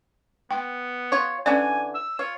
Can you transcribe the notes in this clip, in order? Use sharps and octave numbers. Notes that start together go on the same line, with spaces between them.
B3 G5
F4 C#5
D3 E3 C#4 D5 G#5
E6
F4 C#5